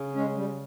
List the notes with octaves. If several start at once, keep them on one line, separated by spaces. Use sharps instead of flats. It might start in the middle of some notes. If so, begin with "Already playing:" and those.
Already playing: C#3
G#3 C#4
G3